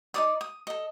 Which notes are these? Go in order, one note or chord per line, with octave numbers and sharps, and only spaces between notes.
D#4 A#4 D5 D#6
D#6
A4 D#5